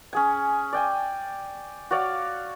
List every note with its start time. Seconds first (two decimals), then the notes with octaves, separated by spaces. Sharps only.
0.13 C#4 G#4 G#5
0.73 D5 G5 G#5
1.91 F#4 C#5 D5 F5